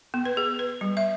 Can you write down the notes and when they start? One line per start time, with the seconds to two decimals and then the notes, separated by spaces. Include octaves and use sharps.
0.14 B3
0.25 B4
0.37 G#4
0.59 B4
0.81 G3
0.97 E5